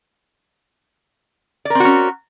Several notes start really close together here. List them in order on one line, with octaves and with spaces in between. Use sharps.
D5 A#4 C4 F#4 C#4